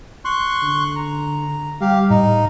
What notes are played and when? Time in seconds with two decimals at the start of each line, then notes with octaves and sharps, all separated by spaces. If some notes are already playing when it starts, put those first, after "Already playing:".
0.25 C6 C#6 F#6
0.63 D3
0.96 A#5
1.81 G3 G4 F5
2.10 A2 D#4